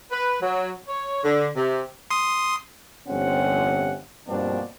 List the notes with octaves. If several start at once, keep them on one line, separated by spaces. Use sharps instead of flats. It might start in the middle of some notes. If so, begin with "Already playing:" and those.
B4
F#3
C#5
D3
C3
C6 D#6
G1 F2 C3 C4 C#4 F#5
G2 B2 F3 A#3 C4 D4